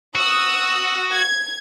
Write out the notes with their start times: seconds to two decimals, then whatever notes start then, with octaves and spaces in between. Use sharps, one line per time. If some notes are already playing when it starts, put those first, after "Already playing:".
0.15 F#4 D#6 E6
1.11 G#6